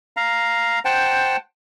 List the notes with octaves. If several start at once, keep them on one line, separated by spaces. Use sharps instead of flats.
F5 A#5
C5 F#5 G5 A5